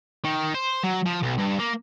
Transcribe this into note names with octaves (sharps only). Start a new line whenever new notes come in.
D#3
C5
F#3
F3
B1
G2
A#3